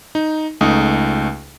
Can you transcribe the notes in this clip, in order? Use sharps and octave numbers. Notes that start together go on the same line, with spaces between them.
D#4
C#2 A3 D#4 D#6